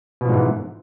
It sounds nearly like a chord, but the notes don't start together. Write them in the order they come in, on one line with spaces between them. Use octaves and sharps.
B2 F3 G#2 E3